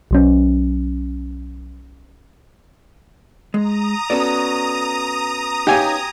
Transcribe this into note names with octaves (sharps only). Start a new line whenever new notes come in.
B1 F#3 C#4
G#3 A#5 D#6
B3 C#4 F#4 A4 D5
D#4 G4 C#5 F5 G#5